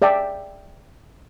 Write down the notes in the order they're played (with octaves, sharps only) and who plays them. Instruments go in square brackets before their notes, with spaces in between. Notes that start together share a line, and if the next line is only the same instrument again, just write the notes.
[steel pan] G#4 D5 E5 G5 A5